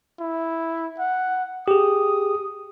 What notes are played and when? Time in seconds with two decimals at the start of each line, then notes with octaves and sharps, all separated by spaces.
0.20 E4
0.99 F#5
1.68 G4 G#4 D#6